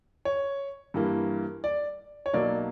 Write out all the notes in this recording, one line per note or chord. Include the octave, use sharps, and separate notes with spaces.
C#5
G2 E3 A#3
D5
C#5
B1 B2 F#3 A#3 D5